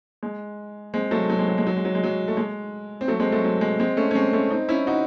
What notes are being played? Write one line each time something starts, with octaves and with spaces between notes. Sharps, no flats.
G#3
G#3 C4
F#3 A3
F#3
G#3
F#3
G#3
F#3
G#3
F#3
G#3
F#3
A3
G#3
C4
F#3 A3
G#3 C4
F#3 A3
F#3
G#3
G#3 C4
A3 C#4
C#4
G#3 C4
A3 C#4
C4 D#4
C#4 E4
D#4 F#4